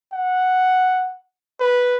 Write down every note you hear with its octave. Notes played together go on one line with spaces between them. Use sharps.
F#5
B4